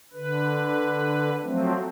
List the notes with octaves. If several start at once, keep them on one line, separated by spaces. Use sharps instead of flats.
D3 B4
F3 F#3 A3 C4